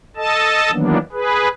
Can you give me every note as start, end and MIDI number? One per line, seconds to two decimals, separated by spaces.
0.17 0.71 69
0.17 0.71 75
0.17 0.71 81
0.72 0.97 51
0.72 0.97 52
0.72 0.97 54
0.72 0.97 58
0.72 0.97 59
0.72 0.97 62
1.12 1.48 68
1.12 1.48 71